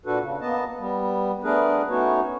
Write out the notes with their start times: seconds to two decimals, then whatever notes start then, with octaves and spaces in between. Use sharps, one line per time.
0.06 A#2 D4 F#4 A4 B4
0.21 C#3
0.41 A#3 B3 D#5 A5
0.79 G3 B3
1.44 A3 B3 D4 G#4 A#4 B4
1.90 A3 B3 C#4 D#4 F#4 C#5